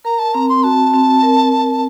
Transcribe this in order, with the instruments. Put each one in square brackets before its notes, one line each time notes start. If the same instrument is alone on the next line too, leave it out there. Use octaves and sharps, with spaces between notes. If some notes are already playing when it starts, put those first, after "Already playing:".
[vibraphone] A#4 [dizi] A#5
[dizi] A5
[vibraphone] C4 [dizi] A#5
[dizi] C6
[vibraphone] F#4 [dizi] A5
[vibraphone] C4
A#4
C4